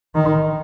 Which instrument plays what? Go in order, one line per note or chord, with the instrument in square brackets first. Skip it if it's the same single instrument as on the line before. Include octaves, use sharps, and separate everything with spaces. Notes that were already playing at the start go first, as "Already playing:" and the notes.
[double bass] D#3